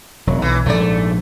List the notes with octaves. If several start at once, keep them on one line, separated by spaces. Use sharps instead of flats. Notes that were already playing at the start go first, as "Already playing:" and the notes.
E1 F#3
B1 E3
A#1 G#2 A3 D5